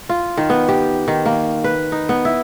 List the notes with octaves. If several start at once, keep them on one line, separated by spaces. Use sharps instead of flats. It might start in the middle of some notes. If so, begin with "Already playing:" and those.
F4
D#3
B3
G4
D#3
A#3
B4
D#4
B3
E4